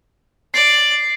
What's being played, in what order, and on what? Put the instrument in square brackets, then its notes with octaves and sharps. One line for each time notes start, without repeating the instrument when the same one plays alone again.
[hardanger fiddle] D5 [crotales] C7